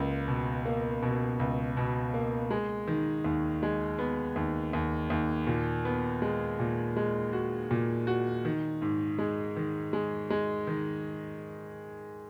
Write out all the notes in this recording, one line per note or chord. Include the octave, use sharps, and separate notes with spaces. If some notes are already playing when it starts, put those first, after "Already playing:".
Already playing: C#2 A#3
B2
A#3
B2
C#2
B2
A#3
G#3
D#3
D#2
G#3
B3
D#2
D#2
D#2
A#2
B3
G#3
A#2
G#3
F#4
A#2
F#4
D#3
G#2
G#3
D#3
G#3
G#3
D#3